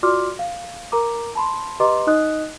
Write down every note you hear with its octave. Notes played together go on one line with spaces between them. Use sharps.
F4 F#4 D5 C6 D6 F6
F5
A#4 A#5 D6
A5 B5 C6
G4 B4 D#5 A#5 C6 D6
D#4 D#5 D#6 F#6